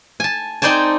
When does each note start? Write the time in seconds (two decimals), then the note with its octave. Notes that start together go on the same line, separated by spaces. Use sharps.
0.20 G#5 A5
0.62 C4 D#4 C5 D5 G#5 A5